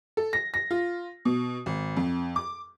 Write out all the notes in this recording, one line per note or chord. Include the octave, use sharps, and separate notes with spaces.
A4
A#6
A#6
F4
B2
G#1
F2
D6